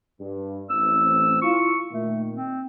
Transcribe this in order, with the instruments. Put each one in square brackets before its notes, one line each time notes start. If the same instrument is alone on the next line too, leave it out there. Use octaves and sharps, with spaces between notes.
[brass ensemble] G2
[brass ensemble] A1 C4 [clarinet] E6
[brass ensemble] E4 F4 [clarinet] C#6
[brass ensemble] A#2 D#3 [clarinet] A3
[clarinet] C4